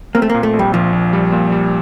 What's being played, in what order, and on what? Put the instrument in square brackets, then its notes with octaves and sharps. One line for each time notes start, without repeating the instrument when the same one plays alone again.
[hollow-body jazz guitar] A#3 [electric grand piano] C4
[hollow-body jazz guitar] A3
[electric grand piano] A#2 [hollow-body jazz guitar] A#3
[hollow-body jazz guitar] A3
[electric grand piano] A#1
[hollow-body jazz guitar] G3
[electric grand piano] A#1 [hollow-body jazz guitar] F3
[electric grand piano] A#1
G3
A#2
G3